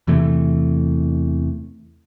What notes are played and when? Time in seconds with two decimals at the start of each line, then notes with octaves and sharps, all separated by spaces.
0.07 E2 C3 E3 A3